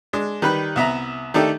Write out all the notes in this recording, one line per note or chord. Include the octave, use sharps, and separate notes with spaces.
G#3 D4
D#3 G3 B4 B5 F#6
C2 B3 E5 A#5
D#3 A3 D4 D#4 G4 A4